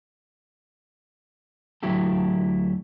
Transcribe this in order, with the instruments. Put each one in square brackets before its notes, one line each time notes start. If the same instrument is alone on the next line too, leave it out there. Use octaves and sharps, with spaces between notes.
[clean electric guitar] D2 F#3 E4 G4 A4